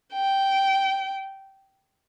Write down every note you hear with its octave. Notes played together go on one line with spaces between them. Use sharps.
G5